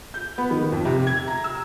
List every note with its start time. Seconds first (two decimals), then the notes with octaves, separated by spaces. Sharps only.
0.14 G6
0.38 B3
0.51 D#3
0.72 F2
0.85 C3
1.07 G#6
1.28 A#5
1.44 E6